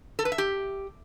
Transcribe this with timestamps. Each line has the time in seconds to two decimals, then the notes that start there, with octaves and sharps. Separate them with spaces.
0.19 A4
0.25 B4
0.32 E5
0.38 G4